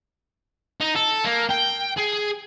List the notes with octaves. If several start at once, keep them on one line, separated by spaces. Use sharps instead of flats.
D#4
A4
A#3
G5
G#4